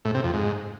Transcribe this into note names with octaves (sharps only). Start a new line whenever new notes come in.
A2
C3
F2
G#2